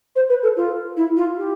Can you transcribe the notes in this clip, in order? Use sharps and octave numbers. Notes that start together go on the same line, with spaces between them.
C5
B4
A4
F4
E4
F4
G4